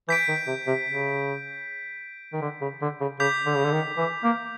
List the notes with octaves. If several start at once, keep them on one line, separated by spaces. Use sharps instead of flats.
E3 G6 B6 D7
D#3
C3
C3
C#3
D#3
D3
C#3
D3
C#3
C#3 D6 G6 B6
D3
C#3
D3
D#3
E3
A#3